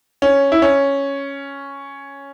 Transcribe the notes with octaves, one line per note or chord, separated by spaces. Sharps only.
C#4
E4
C#4